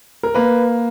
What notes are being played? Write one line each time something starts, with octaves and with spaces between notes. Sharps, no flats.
A#4
A#3 B4